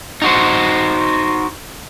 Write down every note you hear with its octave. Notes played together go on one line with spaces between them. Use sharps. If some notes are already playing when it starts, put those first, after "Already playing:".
D#4 F#4 C5